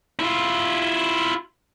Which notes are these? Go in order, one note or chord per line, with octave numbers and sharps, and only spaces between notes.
E4 F4